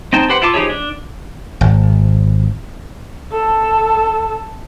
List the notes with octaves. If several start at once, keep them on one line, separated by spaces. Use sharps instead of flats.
C4 D#4 G5 A5
G4 B4 C5 F#5
E4 F4 A5 D6
F3 D#4 G4 G#4 C#5
D4
G#1
A4